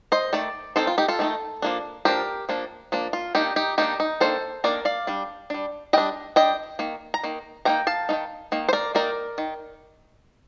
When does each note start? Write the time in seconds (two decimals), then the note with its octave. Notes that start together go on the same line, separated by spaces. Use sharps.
0.12 C5 D#5
0.33 D#3 A3 D5
0.76 D#3 A3 C4 D#4 A4 C5
0.87 F4
0.98 D#4 G4
1.08 F4 A4
1.19 D#3 A3 C4 D#4
1.62 F3 A#3 D4
2.05 F3 A#3 D4 G4 A#4
2.49 F3 A#3 D4
2.92 F3 A#3 D4
3.13 F4
3.35 D#3 A#3 D4 D#4 G4
3.56 D#4 G4
3.78 D#3 A#3 D4 D#4 G4
4.00 D#4
4.20 D#3 A#3 D4 A4 C5
4.64 D#3 A#3 D4 A#4 D5
4.85 D5 F5
5.07 G3 D4
5.50 G3 D4
5.93 G3 D#5 G5
5.98 D4
6.36 G3 D4 D#5 G5
6.79 D#3 A#3
7.14 A#5
7.23 D#3 A#3
7.65 D#3 A#3 D#4 G5 A#5
7.87 F5 A5
8.09 D#3 A#3 D#4
8.52 D#3 A#3
8.69 C5
8.73 A#4 D5
8.95 D#3 A#3 D#4 A#4 D5
9.38 D#3